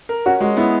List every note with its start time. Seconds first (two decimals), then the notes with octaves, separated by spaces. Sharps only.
0.09 A#4
0.26 C#4 F#4
0.41 G#3 F#4
0.57 B3 E4